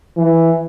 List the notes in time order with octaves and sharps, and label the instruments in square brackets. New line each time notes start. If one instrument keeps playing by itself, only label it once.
[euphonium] E3